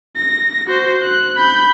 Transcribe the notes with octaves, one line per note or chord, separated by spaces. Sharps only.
A#6
F#4 C5
F#6
B5 G6